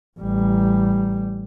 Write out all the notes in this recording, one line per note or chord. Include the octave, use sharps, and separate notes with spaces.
A1 G3